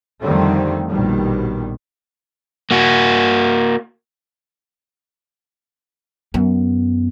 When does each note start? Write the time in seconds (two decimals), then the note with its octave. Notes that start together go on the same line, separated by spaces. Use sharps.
0.21 F2 D3 D#3 G3 A3 C4
0.88 A#1 B2 D#3 G3
2.71 A#3 F#4
6.34 F#2 B3